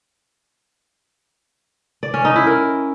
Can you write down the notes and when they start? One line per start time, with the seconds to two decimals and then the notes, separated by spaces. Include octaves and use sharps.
2.03 D5
2.14 C#4
2.25 D#4
2.36 E4
2.47 A#4